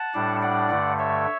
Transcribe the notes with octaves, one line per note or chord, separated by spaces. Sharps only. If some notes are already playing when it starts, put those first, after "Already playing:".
Already playing: F#5 A5
A2 G3 D4
D5 F#5
G2 D3 A3
C#5 E5